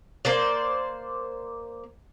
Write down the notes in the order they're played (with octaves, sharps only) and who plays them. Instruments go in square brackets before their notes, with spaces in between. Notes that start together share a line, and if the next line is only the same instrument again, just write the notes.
[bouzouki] A#3 C5 D5